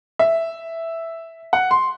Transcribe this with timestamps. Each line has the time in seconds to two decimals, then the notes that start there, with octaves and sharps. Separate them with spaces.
0.19 E5
1.53 F#5
1.71 C6